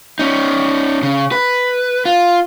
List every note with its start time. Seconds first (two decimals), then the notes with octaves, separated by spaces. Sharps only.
0.19 C#4 D#4
1.03 C#3
1.32 B4
2.05 F4